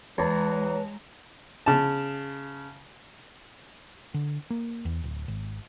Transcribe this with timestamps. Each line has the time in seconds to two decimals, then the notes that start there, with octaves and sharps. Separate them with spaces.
0.18 E2 G#3 B4 C#5 A5 A#5
1.66 C#3 A5
4.14 D3
4.50 A#3
4.85 E2
5.04 D1
5.28 G#1